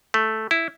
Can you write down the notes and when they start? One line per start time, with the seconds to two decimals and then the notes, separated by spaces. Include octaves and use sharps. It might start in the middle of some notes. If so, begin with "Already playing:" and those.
0.14 A3
0.51 E4